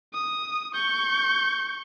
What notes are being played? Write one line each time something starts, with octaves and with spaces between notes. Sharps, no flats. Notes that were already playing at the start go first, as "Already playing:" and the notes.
D#6
C#6 G6